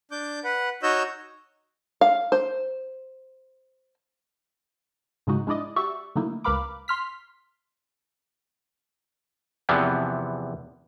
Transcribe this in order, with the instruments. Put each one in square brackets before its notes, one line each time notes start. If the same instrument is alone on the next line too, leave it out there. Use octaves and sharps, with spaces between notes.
[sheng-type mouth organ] D4 D6 G6
B4 F#5
D#4 F#4 C#5 D#5 E6 G6
[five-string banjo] F5
C5
[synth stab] G#2 C#3 F3 G#3 D#4 F#4
G#3 D4 E4 D5 D#5
F#4 G4 D5 E5 C#6
D3 F#3 A3 A#3 D#4 E4
C#2 A#4 B4 F5 B5 D6
C6 F6 B6
[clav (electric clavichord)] E2 C3 E3 F3 B3